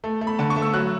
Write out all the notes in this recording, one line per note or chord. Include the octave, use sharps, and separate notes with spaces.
A3
A3
B5
D3 A5
C#6
A3
E6
F#3 F#6